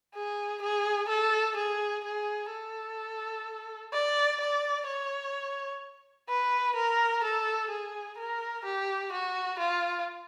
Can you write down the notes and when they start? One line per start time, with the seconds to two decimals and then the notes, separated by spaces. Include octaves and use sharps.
0.15 G#4
0.62 G#4
1.09 A4
1.57 G#4
2.04 G#4
2.52 A4
3.93 D5
4.40 D5
4.87 C#5
6.29 B4
6.76 A#4
7.24 A4
7.70 G#4
8.18 A#4
8.65 G4
9.12 F#4
9.59 F4